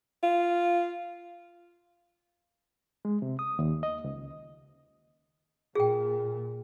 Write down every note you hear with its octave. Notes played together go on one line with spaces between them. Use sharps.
F4
G#3
C3
D#6
D#2
D#5
C#2
A#2 G#4 G5